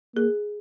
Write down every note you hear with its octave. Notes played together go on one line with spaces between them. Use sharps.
A#3 G#4